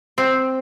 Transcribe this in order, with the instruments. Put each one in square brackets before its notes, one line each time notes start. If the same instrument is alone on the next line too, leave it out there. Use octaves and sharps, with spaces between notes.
[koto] C4